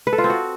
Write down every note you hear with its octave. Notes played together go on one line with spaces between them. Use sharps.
B4
A4
F4
C4
F#4